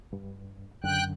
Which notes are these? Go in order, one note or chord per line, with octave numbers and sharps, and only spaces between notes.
G2
F#2 D3 G5 F#6